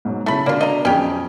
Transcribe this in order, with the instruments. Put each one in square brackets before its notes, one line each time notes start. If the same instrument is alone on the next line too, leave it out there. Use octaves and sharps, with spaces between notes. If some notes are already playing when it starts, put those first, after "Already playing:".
[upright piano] G#2 B2 F#3
[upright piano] C#3 G#3 E4 [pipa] A3 B5
[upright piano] B2 D3 D5 [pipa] A#3 F4
[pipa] D#5 A#5
[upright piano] B1 F2 G#4 [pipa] C#4 G4